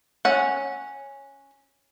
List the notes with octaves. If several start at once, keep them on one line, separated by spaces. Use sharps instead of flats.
C#4 F#5